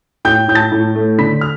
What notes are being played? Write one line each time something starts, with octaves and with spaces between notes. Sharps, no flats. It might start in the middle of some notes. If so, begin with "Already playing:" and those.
A2 G5 G6
A2 G6
A5 A6
A2
A3
D3 B5 B6
F6